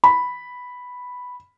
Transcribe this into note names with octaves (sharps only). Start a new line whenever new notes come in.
B5